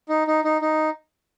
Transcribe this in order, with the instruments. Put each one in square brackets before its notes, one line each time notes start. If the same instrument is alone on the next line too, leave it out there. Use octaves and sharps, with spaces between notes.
[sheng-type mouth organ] D#4
D#4
D#4
D#4